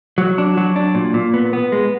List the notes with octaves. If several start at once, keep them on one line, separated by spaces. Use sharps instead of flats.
F#3
D4
F#3
D4
A#2
A#2
B3
B3
G#3